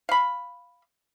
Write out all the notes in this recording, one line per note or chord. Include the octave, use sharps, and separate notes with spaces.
F5 B5